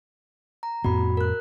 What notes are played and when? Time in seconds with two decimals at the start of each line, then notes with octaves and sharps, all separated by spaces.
0.63 A#5
0.84 F2 A2 B3 F#4 B5
1.17 A#4 F#6